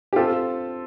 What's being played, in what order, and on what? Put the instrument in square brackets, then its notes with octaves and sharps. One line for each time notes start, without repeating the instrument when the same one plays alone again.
[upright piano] G4
C4 F4 A4